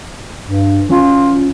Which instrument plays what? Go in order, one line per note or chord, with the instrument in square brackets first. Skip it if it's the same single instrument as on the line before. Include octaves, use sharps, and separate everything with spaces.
[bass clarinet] G2
[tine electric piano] E3 C#4 [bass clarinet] F4